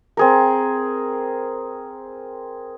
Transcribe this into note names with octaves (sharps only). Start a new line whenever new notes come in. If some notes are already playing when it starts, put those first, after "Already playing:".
C4 G#4 A#4